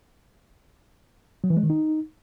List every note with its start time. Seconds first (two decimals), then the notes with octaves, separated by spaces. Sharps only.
1.44 F#3
1.50 E3
1.57 G#3
1.63 D#3
1.70 D#4